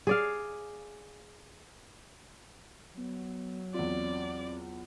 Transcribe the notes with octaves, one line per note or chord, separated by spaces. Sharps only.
G#4 D5 F5
F#3 B3
E2 C4 F4 D5